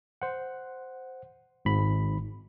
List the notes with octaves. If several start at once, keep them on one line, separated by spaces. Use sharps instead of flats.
C5 F#5
G#1 G#2 B5